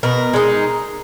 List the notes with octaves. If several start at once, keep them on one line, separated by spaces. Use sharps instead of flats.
B2 A#4
G#3 D#4